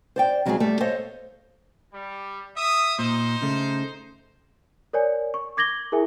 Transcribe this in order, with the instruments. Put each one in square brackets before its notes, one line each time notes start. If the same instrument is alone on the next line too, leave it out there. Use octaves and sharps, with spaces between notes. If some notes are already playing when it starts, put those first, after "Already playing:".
[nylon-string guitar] C5 D5 G5
F2 F#3 G#3 F4 F#4 G#4
G3 A3
A4 C5 C#5 D#5 F5
[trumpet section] G3
E5 D#6
[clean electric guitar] A#2 [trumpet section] D#4 C5
[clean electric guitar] C#3 A3
[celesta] A#4 C#5 D5 G#5
C#6
D6 G#6 A#6 F#7 G7
E4 G#4 A#4 E5 G#5